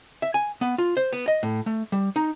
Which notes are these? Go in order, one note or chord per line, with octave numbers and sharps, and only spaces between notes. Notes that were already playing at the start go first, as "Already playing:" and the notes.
E5
G#5
B3
F4
C5
B3
D#5
A2
A3
G3
D#4